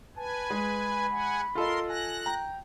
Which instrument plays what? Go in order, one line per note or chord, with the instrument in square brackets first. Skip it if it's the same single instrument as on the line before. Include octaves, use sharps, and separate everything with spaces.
[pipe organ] B4 G#5 [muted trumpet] A5
[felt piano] G#3 [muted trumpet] B5
[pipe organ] F#5 G#5
[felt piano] F4 A4 D#5 [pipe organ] A#4 C6
[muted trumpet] G#5 [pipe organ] F#6 A#6
[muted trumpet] G5 [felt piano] A#5